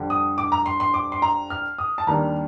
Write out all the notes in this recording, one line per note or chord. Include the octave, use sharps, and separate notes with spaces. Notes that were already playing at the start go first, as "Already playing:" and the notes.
Already playing: F2 D3 G3
D#6
D6
A#5
C6
C6
D6
C6
A#5
F6
D#6
A5
D#2 D#3 G3 D4 A#5